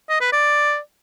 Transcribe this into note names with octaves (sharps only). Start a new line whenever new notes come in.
D#5
B4
D5